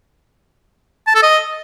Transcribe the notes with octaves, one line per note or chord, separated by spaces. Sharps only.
A5
A4
D#5